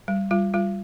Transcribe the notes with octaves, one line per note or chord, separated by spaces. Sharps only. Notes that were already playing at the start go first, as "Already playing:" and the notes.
G3
G3 F4
G3 F4